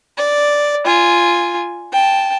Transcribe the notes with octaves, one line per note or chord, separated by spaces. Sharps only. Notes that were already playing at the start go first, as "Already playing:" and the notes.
D5
F4 G#5
G5 A5